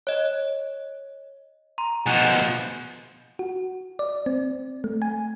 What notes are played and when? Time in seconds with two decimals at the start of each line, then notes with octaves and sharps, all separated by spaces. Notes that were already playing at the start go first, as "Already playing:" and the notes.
0.07 C#5 D#5
1.78 A#5 C6
2.06 B2 F3 G#5 F#6
3.39 F#4
3.99 D5
4.26 C4
4.84 A3
5.02 G#5